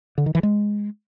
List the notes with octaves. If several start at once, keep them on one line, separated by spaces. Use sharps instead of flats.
D3
D#3
E3
G#3